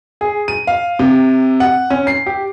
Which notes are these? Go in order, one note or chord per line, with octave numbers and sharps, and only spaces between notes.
G#4
D#7
F5
C3
F#5
C#4
C7
G4